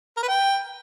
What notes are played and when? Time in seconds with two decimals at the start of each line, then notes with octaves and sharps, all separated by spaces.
0.17 A#4
0.23 B4
0.28 G5